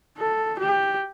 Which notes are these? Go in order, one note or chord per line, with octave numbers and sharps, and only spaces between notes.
A4
G4